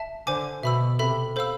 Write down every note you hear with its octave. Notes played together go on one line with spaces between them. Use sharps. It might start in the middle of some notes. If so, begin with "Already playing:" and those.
Already playing: E5 A5
D3 C5 G#5 D6
B2 E5 B5 E6
C3 A4 E5 B5
A4 C5 F5 B5 E6